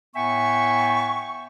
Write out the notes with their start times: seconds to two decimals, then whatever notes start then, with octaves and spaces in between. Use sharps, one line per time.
0.15 A2 B3 E5 G5 G#5 C#6